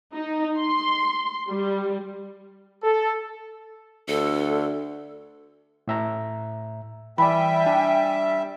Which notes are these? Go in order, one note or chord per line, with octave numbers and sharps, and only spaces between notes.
D#4
C6
G3
A4
D2 A4
A2 E5 A#5
E3 G3 D5 E5 G5 G#5 B5
D4